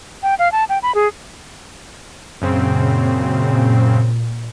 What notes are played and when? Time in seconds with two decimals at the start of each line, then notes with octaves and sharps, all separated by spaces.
0.23 G5
0.39 F5
0.52 A5
0.69 G5
0.83 B5
0.95 G#4
2.42 F#2 A#2 C#3 C4